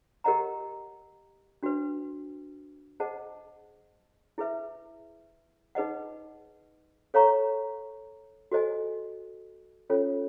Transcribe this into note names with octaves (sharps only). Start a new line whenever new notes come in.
G4 A#4 D#5 F#5 A#5
D4 F#4 B4
G#4 C5 D#5 F#5 A5
E4 G#4 B4 E5
D#4 G#4 B4 D#5 F#5
A4 C#5 F5 A#5 C#6
F#4 A4 C5 D#5 G#5
C#4 F4 A4 C#5